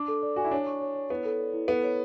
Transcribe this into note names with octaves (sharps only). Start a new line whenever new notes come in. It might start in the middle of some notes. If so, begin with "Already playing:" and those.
Already playing: D4 D6
A4
D5
F#4 G#5
E4
D4 C#5
C#6
C#5
C#5
B3 E4
A4
D5
E4
B3 A4
C#5